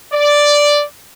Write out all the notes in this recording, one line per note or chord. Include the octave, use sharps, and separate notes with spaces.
D5